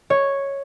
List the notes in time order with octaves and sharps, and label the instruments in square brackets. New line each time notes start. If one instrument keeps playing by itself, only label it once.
[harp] C#5